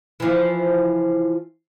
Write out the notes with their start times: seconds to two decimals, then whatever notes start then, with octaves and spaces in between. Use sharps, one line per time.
0.20 E3 F3